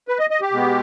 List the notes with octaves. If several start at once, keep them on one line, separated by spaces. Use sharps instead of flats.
B4
D#5
D#5
G4
B2 G#3 B3